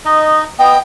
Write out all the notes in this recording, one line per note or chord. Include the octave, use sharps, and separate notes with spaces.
D#4 D#5
B3 D#5 G5